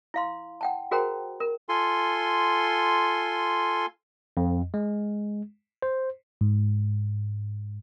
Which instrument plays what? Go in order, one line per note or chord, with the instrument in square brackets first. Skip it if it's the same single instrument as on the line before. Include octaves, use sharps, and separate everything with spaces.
[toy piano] E4 F5 C6
F#5 G5 A5
F#4 G#4 A#4 C5 G5 A#5
A#4
[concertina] F4 A4 G#5 C6
[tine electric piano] F2
G#3
C5
[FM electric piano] G#2